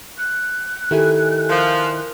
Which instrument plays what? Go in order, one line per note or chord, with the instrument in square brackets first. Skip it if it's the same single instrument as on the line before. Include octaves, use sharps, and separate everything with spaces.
[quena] F#6
[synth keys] D#3 E4 G#5 [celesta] G4 A4
[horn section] F3 [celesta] A#4